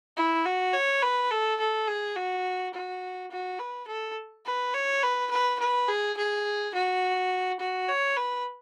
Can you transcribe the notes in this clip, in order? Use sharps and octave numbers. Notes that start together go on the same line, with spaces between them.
E4
F#4
C#5
B4
A4
A4
G#4
F#4
F#4
F#4
B4
A4
B4
C#5
B4
B4
B4
G#4
G#4
F#4
F#4
C#5
B4